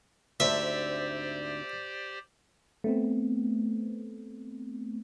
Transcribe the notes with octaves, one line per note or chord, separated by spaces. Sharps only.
D2 G#2 C4 G4 C5 D5 E5
A3 B3 C4